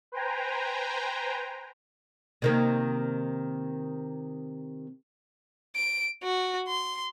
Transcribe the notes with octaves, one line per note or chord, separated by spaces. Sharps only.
B4 C5 G5 G#5 A#5
C3 D#3 A#3
D7
F#4
C6